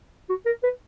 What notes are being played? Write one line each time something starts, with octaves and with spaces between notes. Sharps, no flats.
F#4
A#4
B4